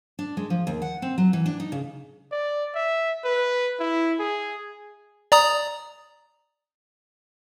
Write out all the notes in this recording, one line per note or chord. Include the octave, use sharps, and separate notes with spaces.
D4
G#3
F3
D#2
F#5
C4
F#3
E3
D4
D#4
C#3
D5
E5
B4
E4
G#4
D5 A#5 D#6